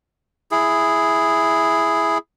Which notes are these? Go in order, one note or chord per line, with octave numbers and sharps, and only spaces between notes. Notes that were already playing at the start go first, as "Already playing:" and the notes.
E4 G#4